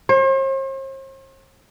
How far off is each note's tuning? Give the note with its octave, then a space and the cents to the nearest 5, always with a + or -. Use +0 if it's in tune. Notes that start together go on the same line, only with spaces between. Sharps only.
C5 +45